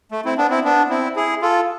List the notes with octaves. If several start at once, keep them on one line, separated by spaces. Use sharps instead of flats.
A3
C4 E4
B3 D4
C4 E4
B3 D4
C4 E4
E4 G#4
F4 A4